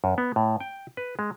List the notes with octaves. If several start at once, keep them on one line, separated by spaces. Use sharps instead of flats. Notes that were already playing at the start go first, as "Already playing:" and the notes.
F#2
B3
A2
G5
B4
G#3